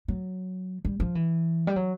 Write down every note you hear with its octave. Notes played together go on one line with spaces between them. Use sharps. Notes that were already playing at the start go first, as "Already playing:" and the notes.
F#3
G3
F3
E3
G3
F#3